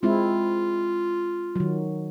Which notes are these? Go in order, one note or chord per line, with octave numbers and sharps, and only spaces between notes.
G#3 C4 E4 F4
D#3 F#3